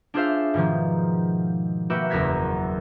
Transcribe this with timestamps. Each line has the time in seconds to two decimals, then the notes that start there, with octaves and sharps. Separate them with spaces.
0.14 D4 F4 G#4 C5 E5 F5
0.54 G#2 B2 D#3 F3
1.90 A#3 F#4 G4 B4 E5
2.10 F#1 E2 F#3 A#4 G#6 B6